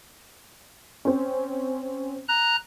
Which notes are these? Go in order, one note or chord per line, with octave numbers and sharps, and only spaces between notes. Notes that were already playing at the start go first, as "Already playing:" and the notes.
C4 C#4
A#5 F#6